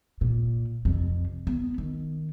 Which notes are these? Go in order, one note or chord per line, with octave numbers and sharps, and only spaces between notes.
A#2
F2 C3
B3
D#3